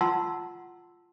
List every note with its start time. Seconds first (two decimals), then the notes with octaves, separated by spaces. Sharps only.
0.01 F4 F#5 A5 A#5 C6 E6